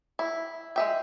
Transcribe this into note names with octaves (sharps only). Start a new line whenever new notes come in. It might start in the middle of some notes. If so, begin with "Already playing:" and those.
E4
G#3 E5 G5